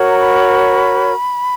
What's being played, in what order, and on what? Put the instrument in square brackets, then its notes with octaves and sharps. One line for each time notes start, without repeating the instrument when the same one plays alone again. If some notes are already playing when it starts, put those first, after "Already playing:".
Already playing: [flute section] F#4 A#4 C#5
A#5
B5